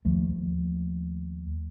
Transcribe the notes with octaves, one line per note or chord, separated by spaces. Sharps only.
D#2 F3 A3